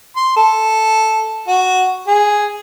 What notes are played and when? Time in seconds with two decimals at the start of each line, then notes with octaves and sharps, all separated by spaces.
0.16 C6
0.36 A4
1.48 F#4
2.07 G#4